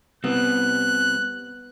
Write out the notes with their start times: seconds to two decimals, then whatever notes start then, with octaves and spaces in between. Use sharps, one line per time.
0.24 G3 B3 C4 F#6